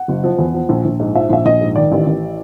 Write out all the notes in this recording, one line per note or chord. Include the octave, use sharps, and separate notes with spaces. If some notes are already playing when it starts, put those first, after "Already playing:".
Already playing: F#5
F#1
F3
E2
F3
A#1
A#1
G#2
F3 E5
A#1 E5
A#1 D#5
G#2
D#3 D5
A1
A1